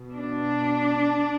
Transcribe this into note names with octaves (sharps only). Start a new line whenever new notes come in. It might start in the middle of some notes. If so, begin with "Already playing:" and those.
Already playing: B2
D4